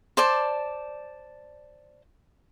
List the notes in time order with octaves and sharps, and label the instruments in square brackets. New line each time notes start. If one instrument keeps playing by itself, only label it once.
[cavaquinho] C5 D5 A5